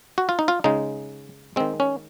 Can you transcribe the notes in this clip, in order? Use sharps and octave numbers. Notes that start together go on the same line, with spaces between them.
F#4
F4
D#4
F4
C#3 G#3 D#4
D#3 G#3 C4
C#4